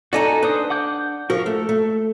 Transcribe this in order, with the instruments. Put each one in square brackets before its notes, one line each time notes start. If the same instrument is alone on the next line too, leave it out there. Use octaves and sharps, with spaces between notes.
[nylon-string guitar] D#4 A4 D5 [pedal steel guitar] F#4 D#5 G#5
[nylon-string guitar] D4 [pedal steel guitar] B4 C5 D#6
[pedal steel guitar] F#5 D6 G6
[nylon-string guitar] F3 [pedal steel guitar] F#4 A#4
[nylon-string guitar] A3 [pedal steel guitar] A4
[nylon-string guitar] A3